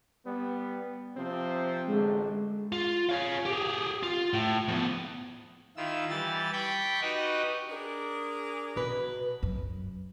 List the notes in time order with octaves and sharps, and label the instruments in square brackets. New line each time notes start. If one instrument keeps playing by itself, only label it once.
[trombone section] G3 B3
C3 F3 C4
[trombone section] A1 D3 A3 [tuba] G#3
[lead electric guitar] F4
C#5 F5
G4 G#4
F4
A2
F3 B3
[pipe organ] D#3 E4 F4 E6
E3 G3 A6
D5 G5 B5 C#6 G6
D#4 F#4 G4 B4 D#5
[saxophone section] D4 G#4 A#4
[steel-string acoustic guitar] B2 B4
[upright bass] F#2